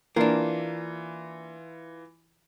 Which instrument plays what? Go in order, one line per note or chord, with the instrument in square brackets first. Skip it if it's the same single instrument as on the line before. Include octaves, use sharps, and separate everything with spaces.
[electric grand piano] E3 F4 [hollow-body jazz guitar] A#3 D4